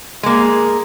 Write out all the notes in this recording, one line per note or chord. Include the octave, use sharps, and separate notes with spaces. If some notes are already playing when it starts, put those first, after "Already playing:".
G#3 A#3